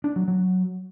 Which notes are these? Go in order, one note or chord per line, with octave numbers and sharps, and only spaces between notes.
D4
F#3
F#3